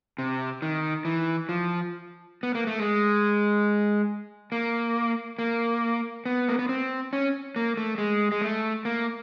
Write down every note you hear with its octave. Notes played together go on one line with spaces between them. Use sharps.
C3
D#3
E3
F3
B3
A#3
A3
G#3
A#3
A#3
B3
A#3
B3
C4
C#4
A#3
A3
G#3
G#3
A3
A#3